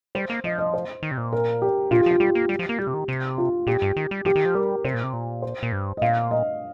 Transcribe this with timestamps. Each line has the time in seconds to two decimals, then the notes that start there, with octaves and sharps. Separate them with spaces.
0.15 G3 C5
0.30 A#3
0.44 F3 D#5
0.58 D#5
0.74 C5
1.03 D#3
1.11 C3
1.17 A#2
1.33 A#4
1.62 G4
1.91 A#2 F4
2.00 G4
2.06 F3 F4
2.20 G3 G4
2.35 A#3
2.49 G3
2.59 F3
2.69 A#3
2.78 G3 G4
2.87 C3
2.94 D#3
3.08 C3
3.38 F4
3.67 A#2 G4
3.82 G2
3.96 D#3
4.11 G3
4.25 F3 G4
4.35 D#3
4.45 F3
4.54 G3 A#4
4.85 C3 C5
4.94 A#2
5.04 C3
5.13 A#2
5.42 C5
5.63 A#2
5.72 G2
5.97 D#5
6.02 A#2 F5
6.31 D#5